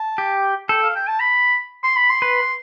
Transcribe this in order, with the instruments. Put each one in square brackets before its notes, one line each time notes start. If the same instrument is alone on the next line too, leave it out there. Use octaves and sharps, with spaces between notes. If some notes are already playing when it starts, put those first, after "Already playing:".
Already playing: [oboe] A5
[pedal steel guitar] G4
[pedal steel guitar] A4 [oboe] G5
[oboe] F5
G5
A5
B5
C6
B5
C6
[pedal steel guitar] B4